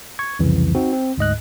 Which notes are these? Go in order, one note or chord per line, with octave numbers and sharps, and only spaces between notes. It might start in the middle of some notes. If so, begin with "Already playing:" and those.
C#6 G#6
C2 F2 C#3 E3
C4 D#4 F#4
C4
D2 G#2 D#5 F#6